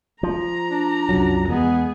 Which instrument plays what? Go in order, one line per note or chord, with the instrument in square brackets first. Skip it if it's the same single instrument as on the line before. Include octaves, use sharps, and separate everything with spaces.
[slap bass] F3 [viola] A#5
[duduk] D4
[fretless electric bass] C2 F#2 F#3
[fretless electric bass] E2 G#3 [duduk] B3 [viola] G#4